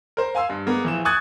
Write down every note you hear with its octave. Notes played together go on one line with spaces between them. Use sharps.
A#4 C5
F5 G#5 C6 E6
G2
G#3 A#3 B3
A#1 E3 E7
G#5 C#6 D#6 F#6 G#6 A6